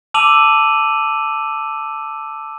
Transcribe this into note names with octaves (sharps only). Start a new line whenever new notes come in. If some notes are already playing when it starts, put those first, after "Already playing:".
A5 D6 E6 D#7 F7 F#7